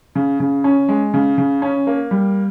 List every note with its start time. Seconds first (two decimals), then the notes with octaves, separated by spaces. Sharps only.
0.15 C#3
0.40 C#3
0.64 C#4
0.89 G#3
1.14 C#3
1.38 C#3
1.62 C#4
1.87 A#3
2.11 G3